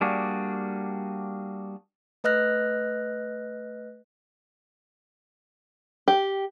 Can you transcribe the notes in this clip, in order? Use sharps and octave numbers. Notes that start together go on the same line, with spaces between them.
G3 A#3 D4 F#4 G#4
A3 B4 D#5 F6 F#6 A#6
G4